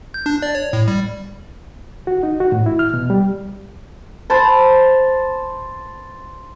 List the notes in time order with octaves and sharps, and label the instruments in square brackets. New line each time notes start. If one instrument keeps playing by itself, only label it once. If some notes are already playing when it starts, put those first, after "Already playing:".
[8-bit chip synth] G6
D4
D5
C#5
A2
G3
[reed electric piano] F#4
D#4
F#4
A2
E4
F6
B2
G3
[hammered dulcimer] C5 A5 B5